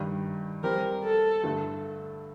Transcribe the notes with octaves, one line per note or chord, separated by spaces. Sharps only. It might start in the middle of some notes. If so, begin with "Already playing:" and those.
Already playing: G2 D#3 G3
G3 C4 G4 A#4 C5
A4
G2 D3 A3